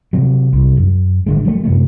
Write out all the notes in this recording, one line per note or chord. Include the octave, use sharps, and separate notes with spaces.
C3 F#3
C2
F#2
G#1 D3 G#3
F#3 A3
F#2 C3 G#3 A3